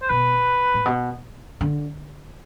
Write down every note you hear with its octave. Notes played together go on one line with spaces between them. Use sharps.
C5
B2 B4
A2
B2
D3